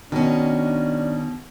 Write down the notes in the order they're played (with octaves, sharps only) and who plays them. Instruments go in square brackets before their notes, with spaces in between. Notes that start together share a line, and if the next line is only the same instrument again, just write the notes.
[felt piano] B2 [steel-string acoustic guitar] D#3 C#4 [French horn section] D4